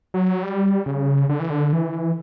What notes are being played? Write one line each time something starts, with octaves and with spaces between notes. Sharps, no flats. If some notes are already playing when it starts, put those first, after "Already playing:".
F#3
G3
C#3
D3
E3
D3
E3